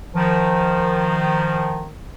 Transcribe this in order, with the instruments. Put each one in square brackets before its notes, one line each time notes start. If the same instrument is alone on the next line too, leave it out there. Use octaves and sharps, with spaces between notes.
[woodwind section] D#3 F3